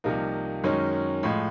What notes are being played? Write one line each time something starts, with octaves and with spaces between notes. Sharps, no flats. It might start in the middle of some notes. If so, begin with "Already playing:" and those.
C2 C3 F3 A#3 D#4
F#2 D#3 G#3 C#4
A2 F3 G#3